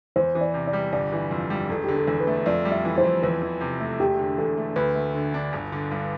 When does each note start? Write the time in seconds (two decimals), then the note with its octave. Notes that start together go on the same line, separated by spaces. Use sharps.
0.16 E2 C5
0.35 E3
0.41 D5
0.54 C3
0.67 D5
0.73 G3
0.93 G1 D5
1.12 E3
1.31 F2
1.50 G3
1.69 E1 A4
1.84 D3 G4
1.95 A4
2.07 E2
2.20 B4
2.27 A3
2.46 F2 D5
2.65 G3
2.72 E5
2.85 E3
2.98 C5
3.04 F2
3.22 E2 B4
3.42 E3
3.61 C3
3.80 A3
3.99 E1 G4
4.19 D3
4.38 E2 A4
4.57 A3
4.76 D2 B4
4.95 A3
5.14 D3
5.34 D4
5.53 G1
5.72 D3
5.91 G2